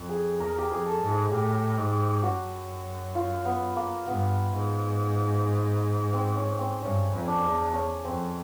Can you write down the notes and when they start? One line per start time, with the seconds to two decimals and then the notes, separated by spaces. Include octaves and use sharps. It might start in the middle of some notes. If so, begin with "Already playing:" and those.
Already playing: F2
0.09 G#4
0.40 E2 A#4
0.58 G4
0.71 F2 G#4
0.86 A4
1.01 G#2
1.09 G#4
1.31 A2 G4
1.77 G#2
2.23 F#2 F#4
3.15 F4
3.45 B3
3.76 A#3
4.07 G2 B3
4.53 G#2
6.13 C4
6.36 C#4
6.59 C4
6.82 G2 C#4
7.12 F2
7.28 D4
7.44 E2
7.74 C#4
8.04 F2 C4